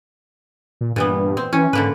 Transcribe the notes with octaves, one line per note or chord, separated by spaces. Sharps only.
A#2
G2 A#2 E3 B3
C4
E3 C#4
G#2 D3 A#3 B4